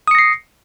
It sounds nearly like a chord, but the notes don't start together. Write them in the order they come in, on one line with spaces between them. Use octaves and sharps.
D#6 C#7 A#6 C7